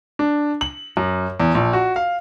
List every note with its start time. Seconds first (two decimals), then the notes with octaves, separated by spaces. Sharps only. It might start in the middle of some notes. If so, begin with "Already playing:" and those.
0.19 D4
0.61 F#7
0.97 F#2
1.40 E2
1.55 A#1
1.73 F#4
1.96 F5